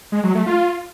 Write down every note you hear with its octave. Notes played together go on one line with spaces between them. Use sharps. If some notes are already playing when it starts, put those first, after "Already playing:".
G#3
F#3
A3
F4